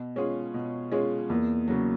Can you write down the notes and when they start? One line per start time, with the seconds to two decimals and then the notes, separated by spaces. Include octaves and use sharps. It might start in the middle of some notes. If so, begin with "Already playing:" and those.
Already playing: B2
0.16 G#3 C#4 F4 G#4
0.54 B2
0.92 G#3 C#4 F4 G#4
1.30 E2 A#3
1.68 C#3 F#3